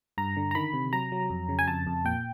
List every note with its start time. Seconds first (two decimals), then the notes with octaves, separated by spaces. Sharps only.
0.18 G2 A#5
0.37 D3
0.51 A#5
0.55 D#3 B5
0.73 C3
0.93 F#3 A#5
1.12 F#3
1.30 F2
1.49 C#3
1.59 G#5
1.68 F2 A5
1.87 F2
2.05 A#2 G5